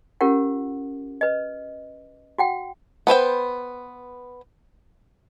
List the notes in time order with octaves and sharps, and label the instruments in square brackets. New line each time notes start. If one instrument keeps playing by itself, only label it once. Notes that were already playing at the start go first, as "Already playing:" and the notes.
[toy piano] C#4 F4 G4 A#4 F#5
B4 D#5
F#4 F#5 G5
[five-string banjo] B3 B4 C5 G5